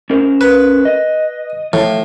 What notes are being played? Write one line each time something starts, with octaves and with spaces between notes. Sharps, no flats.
C#4 A#4 C5
B4
D#5
A2 F3